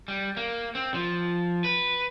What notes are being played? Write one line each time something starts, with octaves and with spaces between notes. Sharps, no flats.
G3
A#3
C4
F3
B4